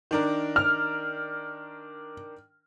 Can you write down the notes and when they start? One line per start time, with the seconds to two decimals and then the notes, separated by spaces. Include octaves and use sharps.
0.11 D#3 D4 A#4
0.56 F6